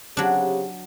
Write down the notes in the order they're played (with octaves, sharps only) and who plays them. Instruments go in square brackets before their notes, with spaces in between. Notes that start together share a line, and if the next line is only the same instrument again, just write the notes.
[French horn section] C#3 C4 G4 [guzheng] F#3 D4